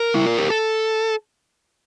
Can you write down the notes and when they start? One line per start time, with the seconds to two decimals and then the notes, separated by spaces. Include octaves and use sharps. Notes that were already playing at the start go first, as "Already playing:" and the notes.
Already playing: A#4
0.15 E4
0.26 F4
0.38 G4
0.50 A4